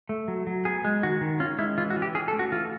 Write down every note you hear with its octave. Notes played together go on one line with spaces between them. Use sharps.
A3
F#3
F#3
B3 G#4
G#3
D#3 F#4
D#3
C#4 F4
G#3 E4
E3 F4
F#4
E3
G4
C#4 G#4
A4
A3
F#4
E3 F4